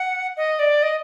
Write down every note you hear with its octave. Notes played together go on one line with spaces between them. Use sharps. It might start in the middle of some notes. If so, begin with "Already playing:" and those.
Already playing: F#5
D#5
D5
D#5